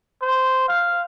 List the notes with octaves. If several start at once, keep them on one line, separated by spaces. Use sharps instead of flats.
C5
F5